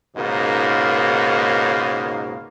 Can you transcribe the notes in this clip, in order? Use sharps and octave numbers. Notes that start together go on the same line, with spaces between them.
C#2 G#2 B2 D#3 A#3